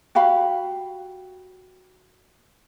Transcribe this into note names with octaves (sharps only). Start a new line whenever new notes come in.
F#4 G4 F5 B5